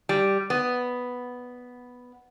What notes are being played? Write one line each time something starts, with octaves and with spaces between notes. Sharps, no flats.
G3
B3